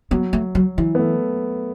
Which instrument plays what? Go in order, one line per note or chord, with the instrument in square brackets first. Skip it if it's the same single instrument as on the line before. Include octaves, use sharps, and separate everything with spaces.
[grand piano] F#3 [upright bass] B3
[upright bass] A3
F#3
E3
[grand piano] B3
A3